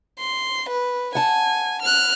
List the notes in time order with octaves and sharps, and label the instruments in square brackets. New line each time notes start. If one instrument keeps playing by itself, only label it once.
[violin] C6
B4
[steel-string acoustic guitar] F#5 A5 [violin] G#5
[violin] F6 F#6